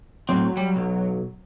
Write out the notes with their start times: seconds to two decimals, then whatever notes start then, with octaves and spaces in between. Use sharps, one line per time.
0.29 A2 F#3 C4
0.57 G3
0.76 B1